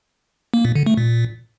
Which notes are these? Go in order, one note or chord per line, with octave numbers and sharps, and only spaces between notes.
A#3
A#2
D3
A3
A#2